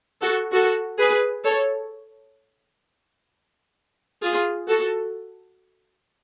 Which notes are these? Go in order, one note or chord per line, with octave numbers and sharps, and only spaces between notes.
F#4 A4
F#4 A4
G#4 B4
A4 C#5
F4 G#4
F#4 A4